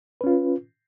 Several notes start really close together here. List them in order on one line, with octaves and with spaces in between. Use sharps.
B4 C#4 F4